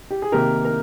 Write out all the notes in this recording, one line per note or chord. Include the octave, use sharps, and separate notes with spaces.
G4
G#4
C3 D#3 A#3 G4 A#4
A#4